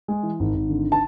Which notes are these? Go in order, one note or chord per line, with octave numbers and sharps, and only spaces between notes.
G#3
E3
G#1
G#1
D3
A5